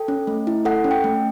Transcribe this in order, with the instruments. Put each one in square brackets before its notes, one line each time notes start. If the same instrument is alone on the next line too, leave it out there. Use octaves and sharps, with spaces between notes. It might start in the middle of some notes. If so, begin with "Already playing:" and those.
Already playing: [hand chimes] A4 G5
C#4
A3
E4
A4 F#5
C#4
G5
A3